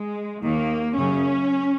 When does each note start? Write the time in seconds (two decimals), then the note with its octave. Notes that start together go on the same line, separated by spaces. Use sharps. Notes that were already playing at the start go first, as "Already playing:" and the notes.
Already playing: G#3
0.44 D#2 D#3 A#3
0.97 F#2 C#3 C#4